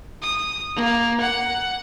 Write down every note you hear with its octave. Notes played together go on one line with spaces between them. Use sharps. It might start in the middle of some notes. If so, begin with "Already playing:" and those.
D#6
A#3
F#5